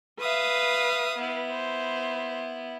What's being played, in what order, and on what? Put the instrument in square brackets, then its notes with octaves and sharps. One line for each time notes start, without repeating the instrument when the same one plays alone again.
[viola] B4 F5 [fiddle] E5 D#6
[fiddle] B3 E4
[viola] C5